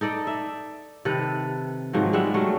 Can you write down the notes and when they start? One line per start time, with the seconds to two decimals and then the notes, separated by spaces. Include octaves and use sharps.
0.01 D#4 A4 D5 D#5
0.27 E5
1.05 C3 D#3 A4 B4
1.93 G#2 D#3 F3 F#3
2.13 G3 G#3 E5 F#5
2.34 F#3 G3 A3 C#4